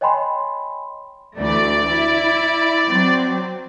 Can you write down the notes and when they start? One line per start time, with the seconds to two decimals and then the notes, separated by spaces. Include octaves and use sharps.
0.01 C#5 D#5 G5 G#5 B5 C6
1.37 D2 E3 A3 D5
1.88 E4
2.89 F#3 C4